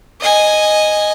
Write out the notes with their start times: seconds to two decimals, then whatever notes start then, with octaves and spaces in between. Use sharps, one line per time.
0.21 D#5 G#5